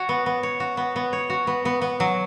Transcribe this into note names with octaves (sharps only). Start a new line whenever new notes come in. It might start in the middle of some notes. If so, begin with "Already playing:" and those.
Already playing: F#4 C#5
B3
B3
C#5
F#4
B3
B3
C#5
F#4
B3
B3
B3
F#3